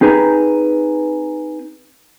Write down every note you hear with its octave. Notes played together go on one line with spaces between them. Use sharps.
C4 D#4 G#4 B4 G#5 A#5